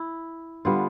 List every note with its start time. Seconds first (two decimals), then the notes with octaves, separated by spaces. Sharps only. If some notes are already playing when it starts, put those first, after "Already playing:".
Already playing: E4
0.65 D3 G3 B3 D4 F4